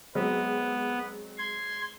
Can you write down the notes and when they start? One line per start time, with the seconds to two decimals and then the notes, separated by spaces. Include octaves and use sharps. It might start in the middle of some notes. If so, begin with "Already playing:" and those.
0.15 F#3 G#3 B3 C4
1.38 C6 G#6